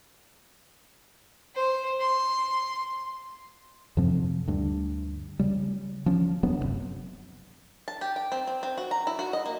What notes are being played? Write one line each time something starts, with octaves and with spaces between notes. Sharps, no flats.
C5
C6
F2 C3 F3 C4
D2 G2
C#3 G3
F3 C#4
D#1 F#3 B3 D4
F#1 C2 C3
A5
G4
G5
C4
C4
C4
F#4
A#5
E4
F#4
D#5
A#3